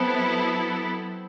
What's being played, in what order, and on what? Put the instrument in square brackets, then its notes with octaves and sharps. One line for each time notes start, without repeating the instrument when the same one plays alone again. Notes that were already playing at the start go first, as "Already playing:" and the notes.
Already playing: [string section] F#3 B3 E4 A4 [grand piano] C4